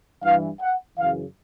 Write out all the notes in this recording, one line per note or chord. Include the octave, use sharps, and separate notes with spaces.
G2 E3 F5
F#5
F#2 C#3 E3 F5